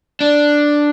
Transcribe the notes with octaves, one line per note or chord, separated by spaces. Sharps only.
D4